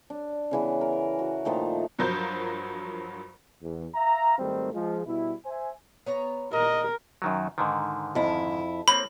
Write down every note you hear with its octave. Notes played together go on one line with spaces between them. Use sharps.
D4
C#3 E3 B3
A#4
F#4
A#2 D#3 F3 A3
G2 F3 F#3 A#4 C5 G6
E2
E5 F5 A#5
G#1 D#3 G3 A3 C4
F3 G#3
B2 G3 E4
C5 E5 G#5
B3 C#5 A#5
A#2 A#4 D#5
F#2 D#3 F#3
G#2 D3 D#3
F2 E4
A#3 C4 C#5 B5